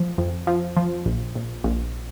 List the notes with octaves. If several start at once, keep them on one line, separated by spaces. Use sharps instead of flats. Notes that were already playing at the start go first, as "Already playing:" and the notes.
Already playing: F3
F2
F3
F3
A#1
A#1
A#1